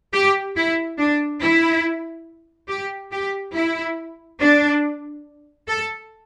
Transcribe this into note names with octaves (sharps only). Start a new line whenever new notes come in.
G4
E4
D4
E4
G4
G4
E4
D4
A4